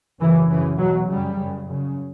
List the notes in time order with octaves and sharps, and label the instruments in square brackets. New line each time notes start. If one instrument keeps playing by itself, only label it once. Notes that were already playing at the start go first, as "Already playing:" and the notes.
[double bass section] F#2 C#3 E3
F#2 C#3 E3
E2 B2 F#3
F#2 C#3 G3
F#2 C#3
F#2 C#3